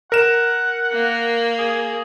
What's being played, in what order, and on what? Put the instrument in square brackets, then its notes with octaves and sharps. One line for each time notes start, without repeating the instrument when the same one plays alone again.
[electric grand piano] A#4 E7 [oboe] F#5
[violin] A#3
[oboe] G#4